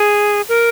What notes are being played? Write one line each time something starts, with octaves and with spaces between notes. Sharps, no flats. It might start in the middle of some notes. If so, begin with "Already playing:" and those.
Already playing: G#4
A#4